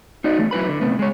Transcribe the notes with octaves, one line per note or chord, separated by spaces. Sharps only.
D#4 F#4 D5 D#5
E2 A3
F#3 E4 B4 B5
D3
C3 A3 B3
G#3 C#5